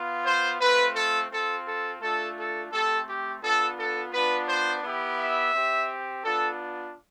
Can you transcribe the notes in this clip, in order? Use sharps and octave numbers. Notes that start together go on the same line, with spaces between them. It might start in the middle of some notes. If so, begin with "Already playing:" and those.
Already playing: B3 F4
C5
A3 C4 F4 B4
A4
C4 F4 A4
A4
A3 D4 F4 A4
A4
A3 C4 G4 A4
G4
B3 D4 F4 A4
A4
B3 D4 F4 B4
C5
B3 E4 G4
E5
C4 G4
B3 D4 F4 A4